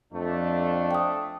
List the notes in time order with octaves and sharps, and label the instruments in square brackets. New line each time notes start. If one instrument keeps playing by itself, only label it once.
[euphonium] F2 [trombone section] A3 D4
[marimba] G5 D#6